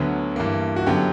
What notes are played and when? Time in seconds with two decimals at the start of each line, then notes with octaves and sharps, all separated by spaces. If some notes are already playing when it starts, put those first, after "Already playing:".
Already playing: D2 D3 F#3 B3
0.36 G2 E3 A#3
0.76 F#4
0.86 F#2 D3 F#3 B3 G4